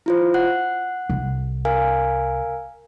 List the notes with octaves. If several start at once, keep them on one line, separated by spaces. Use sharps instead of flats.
E4 F4 C5
F#5 F#6
C2
A#4 F5 G#5